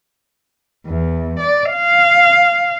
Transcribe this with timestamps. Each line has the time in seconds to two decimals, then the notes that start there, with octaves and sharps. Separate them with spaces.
0.87 E2
1.40 D5
1.72 F5